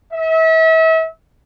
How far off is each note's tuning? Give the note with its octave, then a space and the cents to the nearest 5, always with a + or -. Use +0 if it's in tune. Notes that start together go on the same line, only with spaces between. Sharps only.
E5 -35